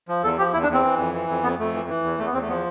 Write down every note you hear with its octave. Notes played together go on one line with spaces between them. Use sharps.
F3
E2 A4
F3 G4
E2 E4
D4
E2 C4
E3
F2
E3
F2
F2 B3
F2 A3
E3
E3
E2
E2 A3
B3
E2 C4
A3
F3 B3